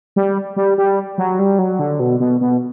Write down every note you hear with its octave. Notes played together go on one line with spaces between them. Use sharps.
G3
G3
G3
F#3
G3
F#3
D3
B2
B2
B2